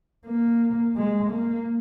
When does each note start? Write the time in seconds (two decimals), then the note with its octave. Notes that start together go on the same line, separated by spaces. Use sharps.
0.27 A#3
0.96 G#3
1.31 A#3